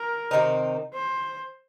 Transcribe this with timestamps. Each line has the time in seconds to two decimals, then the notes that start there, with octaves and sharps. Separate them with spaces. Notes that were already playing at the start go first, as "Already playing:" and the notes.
Already playing: A#4
0.31 C3 D#3 C4 D#4
0.94 C5